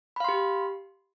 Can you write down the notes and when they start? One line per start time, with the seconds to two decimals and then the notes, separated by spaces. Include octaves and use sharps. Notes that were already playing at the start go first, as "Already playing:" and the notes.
0.16 B5
0.20 F5
0.24 C6
0.28 G4